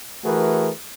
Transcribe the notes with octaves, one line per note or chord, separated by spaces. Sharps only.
E3 A3 F#4 G#4 A#4 B4